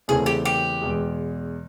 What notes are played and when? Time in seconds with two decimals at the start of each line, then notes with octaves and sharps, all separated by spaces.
0.08 E2 C#3 E3 A3 C4 G#4
0.26 G4
0.45 G4
0.82 E2 B2 G#3